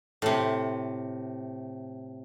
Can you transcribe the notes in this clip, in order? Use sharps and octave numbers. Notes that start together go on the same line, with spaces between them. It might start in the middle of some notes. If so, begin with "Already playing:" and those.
A2 C3